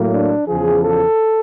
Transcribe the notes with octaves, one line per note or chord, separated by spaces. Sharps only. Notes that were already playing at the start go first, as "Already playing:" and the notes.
Already playing: A2 F#3 A#3
D4
E2 C#3 F3 G#4
A4